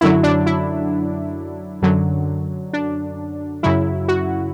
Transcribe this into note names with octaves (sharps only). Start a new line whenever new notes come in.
F#2 D3 F#3 E4
D4
E4
F#2 D3 F#3
D4
F#2 C#3 F#3 E4
F#4